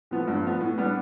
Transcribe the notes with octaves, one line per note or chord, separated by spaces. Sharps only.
A2 F3 B3
G2
F3 B3
A2
G3 B3 D4